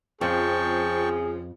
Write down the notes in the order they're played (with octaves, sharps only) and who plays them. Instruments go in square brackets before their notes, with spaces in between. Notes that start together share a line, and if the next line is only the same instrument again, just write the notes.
[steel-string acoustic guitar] F2 [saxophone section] C#3 F3 C4 [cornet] G#4 [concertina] G5 A5 C#6